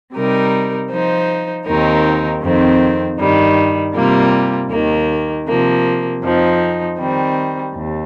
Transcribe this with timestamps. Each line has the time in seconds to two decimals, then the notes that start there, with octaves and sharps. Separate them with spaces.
0.13 C3 G3 D#4 A#4
0.89 F3 D#4 C5
1.65 D#2 D#3 C4 D#4 A#4
2.42 F2 D#3 C4
3.18 G2 D#3 G3
3.94 C3 G3 A#3 F4
4.70 D#2 D#3 A#3
5.47 C3 F3 A#3
6.22 F2 F3 C4 D#4
6.98 D#3 G3 C4
7.75 D#2